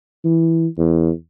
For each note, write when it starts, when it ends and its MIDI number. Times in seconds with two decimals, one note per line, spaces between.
0.25 0.67 52
0.78 1.10 40